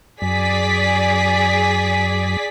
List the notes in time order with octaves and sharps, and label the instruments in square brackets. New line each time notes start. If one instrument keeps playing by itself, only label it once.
[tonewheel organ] F#2 [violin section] G#4 D5 B6